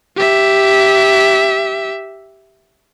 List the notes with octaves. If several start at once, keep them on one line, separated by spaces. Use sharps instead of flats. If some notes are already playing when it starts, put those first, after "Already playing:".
G4 E5